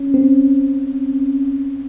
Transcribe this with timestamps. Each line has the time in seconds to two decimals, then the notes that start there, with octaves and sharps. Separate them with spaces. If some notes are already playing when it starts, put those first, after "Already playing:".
Already playing: C#4
0.14 C4